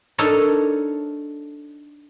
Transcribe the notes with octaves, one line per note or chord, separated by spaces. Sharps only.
D4 D#4 A4 A#4 C#5